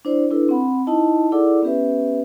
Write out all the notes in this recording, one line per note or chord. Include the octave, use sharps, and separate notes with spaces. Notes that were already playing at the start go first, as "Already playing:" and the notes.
D4 E4 C5 D5
D4 E4 A4 B4
C4 F#5 B5
D#4 E4 D#5 A5
E4 G#4 A4 D5 F#5 D6
B3 C#4 G4 B4 E5